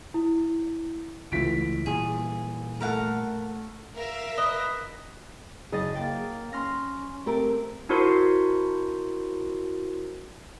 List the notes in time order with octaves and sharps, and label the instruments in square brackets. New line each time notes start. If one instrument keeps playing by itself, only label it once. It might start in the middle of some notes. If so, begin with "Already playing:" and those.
[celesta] E4
[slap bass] C#2 A3 [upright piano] E3 B6 D7 [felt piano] F4
[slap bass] A#2 G3 [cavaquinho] G#4
[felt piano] A3 A4 [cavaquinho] A#4 F5 F#5
[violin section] A#4 E5 F5
[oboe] B4 [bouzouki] D#5
[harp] F#1 D#5 A6 [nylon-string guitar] G#4
[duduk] A#3 [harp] G5 A6
[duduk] C#4 [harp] C6 F6 A#6
[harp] A3 [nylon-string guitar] C4 G4 A#4
[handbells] D4 E4 F#4 A#4 C5 C6